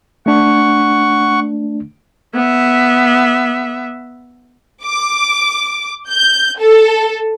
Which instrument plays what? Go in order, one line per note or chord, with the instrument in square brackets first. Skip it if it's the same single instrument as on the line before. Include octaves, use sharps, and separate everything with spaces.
[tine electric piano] A3 D4 [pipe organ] F#5 C#6
[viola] B3 E5
[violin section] D6
G6
A4